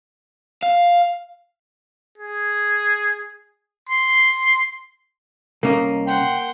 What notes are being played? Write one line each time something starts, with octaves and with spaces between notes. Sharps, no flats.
F5
G#4
C6
C2 A#3 C#4 D#5
F#5 G5 C6